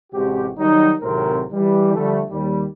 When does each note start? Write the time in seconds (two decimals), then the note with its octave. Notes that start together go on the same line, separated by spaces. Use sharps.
0.12 A1 C3 G#3 F#4 G4
0.58 D#3 F#3 G3 D#4
1.01 G#1 A2 C3 F#3 C4 A#4
1.51 E3 G3
1.93 D3 F3 G3 A3
2.29 D#2 G3